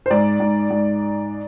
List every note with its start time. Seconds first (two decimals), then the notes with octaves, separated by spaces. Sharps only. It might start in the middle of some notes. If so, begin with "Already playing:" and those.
0.06 C5
0.10 G#2 D5
0.40 G#2
0.70 G#2